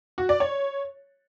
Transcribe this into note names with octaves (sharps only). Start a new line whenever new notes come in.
F#4
D5
C#5